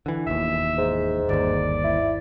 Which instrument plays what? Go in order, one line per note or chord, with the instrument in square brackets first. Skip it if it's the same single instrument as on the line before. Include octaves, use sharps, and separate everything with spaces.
[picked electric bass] D3 E3
[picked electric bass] E1 D#2 [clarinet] E5
[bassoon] G#2
[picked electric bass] G1 D#2 [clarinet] D5
[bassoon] E4